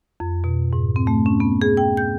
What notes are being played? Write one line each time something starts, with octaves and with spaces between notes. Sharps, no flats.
F2
B2
G#2
C4
A3
C#4
B3
G#4
G5
G6